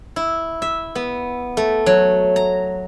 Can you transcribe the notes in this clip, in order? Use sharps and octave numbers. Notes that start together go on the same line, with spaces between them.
E4
E5
B3
A3
F#3
A#5